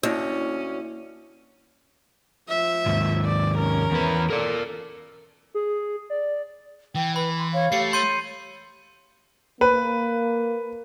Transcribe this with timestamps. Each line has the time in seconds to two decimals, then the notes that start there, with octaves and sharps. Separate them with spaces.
0.03 D2 A#3 C#4 E4
2.49 F3 E5
2.86 D#2 G#2
3.25 D5
3.56 C#4 A#4
3.91 E2 B4
4.30 A4 A#4 D5
5.54 G#4
6.10 D5
6.95 E3 G5
7.16 B4 B5
7.38 C6
7.53 C#5 F5
7.72 A3 G4 C7 C#7
7.93 C#5 C6 G6 D#7
9.61 A#3 B4